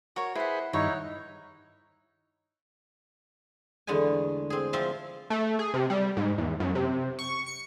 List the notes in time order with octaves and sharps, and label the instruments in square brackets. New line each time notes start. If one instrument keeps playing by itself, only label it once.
[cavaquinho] F#4 A#4 C#5
[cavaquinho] E4 F#5 [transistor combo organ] G#4 B4 C5
[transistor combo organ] G2 D#3 [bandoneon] D#4 E4 [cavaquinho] C#5 F#5
[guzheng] E2 D3 G#3 A3 G#5
C4 G#4
F3 C4 E5 F5 C6
[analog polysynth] A3
G#4
C3
G3
G#2
E2
F#2
C3
C#6
C#7